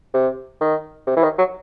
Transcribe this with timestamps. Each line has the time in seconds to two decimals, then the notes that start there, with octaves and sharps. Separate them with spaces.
0.14 C3
0.61 D#3
1.07 C3
1.17 E3
1.23 D#3
1.38 F#3